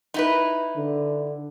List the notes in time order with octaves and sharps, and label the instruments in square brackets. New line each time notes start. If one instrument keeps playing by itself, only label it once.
[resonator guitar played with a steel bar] D#4 E4 B4
[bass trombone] D3